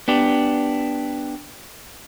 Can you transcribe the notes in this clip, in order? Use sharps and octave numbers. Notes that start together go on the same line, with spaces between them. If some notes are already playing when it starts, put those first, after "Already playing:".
B3 D4 G4